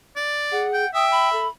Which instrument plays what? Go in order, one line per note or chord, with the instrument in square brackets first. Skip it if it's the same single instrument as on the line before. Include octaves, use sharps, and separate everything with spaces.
[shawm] D5
[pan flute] G#4 [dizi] F#5
[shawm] G5
[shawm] E5 [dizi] G5 [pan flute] D#6
[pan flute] B5
[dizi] A4